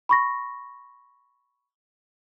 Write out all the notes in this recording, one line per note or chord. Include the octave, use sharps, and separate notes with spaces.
B5 C#6 A#6